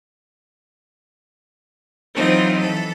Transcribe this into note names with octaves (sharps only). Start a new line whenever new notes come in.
E3 F#3 C4 D#4 F4
E3 A4